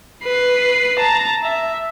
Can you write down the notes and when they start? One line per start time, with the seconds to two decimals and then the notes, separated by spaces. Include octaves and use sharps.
0.24 B4 C7
0.99 A5 A#5
1.44 E5